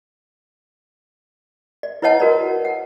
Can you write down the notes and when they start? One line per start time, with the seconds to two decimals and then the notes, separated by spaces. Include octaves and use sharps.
1.83 D5
2.02 E4 B4 C#5 D#5 F#5 A5
2.20 F#4 A#4 B4 D5
2.65 F#5